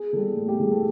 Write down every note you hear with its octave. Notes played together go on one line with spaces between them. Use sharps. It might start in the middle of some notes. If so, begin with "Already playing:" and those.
Already playing: G#4
E3 G3 A4
A2
G4
E3 G3 G#4
A4